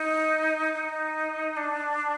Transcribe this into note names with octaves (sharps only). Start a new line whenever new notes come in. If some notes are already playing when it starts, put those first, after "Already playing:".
Already playing: D#4
D#4
D4